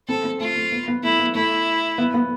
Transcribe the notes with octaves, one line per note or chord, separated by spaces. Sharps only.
C4 A4
C4
A3 F4
A3
B3
B3
A3 E4
B3
A3 E4
B3
B3